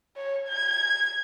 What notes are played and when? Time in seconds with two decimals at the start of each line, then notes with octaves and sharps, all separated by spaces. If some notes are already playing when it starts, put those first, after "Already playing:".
0.16 C#5
0.48 G#6